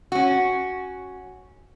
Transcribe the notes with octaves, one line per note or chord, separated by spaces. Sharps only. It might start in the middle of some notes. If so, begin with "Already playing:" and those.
C#4 F#4